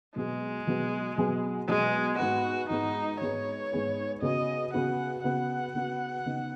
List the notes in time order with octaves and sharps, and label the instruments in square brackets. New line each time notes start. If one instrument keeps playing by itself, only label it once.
[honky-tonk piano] B2 F#3 B3 G#4 [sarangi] G#3
[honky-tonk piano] B2 F#3 B3 G#4
B2 F#3 B3 G#4
[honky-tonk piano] B2 F#3 B3 G#4 [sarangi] G#3
[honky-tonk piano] G#2 G#3 B3 G#4 B4 [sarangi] F#4
[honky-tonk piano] G#2 G#3 B3 G#4 B4 [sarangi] D#4
[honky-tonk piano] G#2 G#3 B3 G#4 B4 [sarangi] C#5
[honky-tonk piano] G#2 G#3 B3 G#4 B4
[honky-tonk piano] C#3 B3 F#4 B4 [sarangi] D#5
[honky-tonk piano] C#3 B3 F#4 B4 [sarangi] F#5
[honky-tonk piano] C#3 B3 F#4 B4 [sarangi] F#5
[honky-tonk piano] C#3 B3 F#4 B4
C#3 B3 D#4